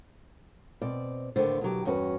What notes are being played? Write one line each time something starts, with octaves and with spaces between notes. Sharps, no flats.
B2 C4 D5
D#2 A2 D3 B3 C5 D5
B2 D3 F#3 G4
E2 G2 C#4 F#4 G4 B4